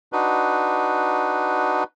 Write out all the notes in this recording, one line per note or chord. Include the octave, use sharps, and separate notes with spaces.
D4 D#4 F#4 B4